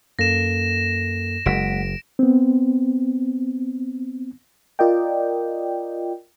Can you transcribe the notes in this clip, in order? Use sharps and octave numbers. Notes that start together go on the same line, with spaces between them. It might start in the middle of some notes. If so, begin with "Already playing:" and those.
F#2 A#3 A4 A#6 E7
F#1 G#3 F#5 B6 D7
B3 C4
F4 A#4 D5 D#5 G5